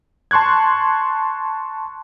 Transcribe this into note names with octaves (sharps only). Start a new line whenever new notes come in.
A5 C6 C#6 F#6 G#6